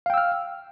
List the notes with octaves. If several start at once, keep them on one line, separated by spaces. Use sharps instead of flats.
F5 G5 E6 F6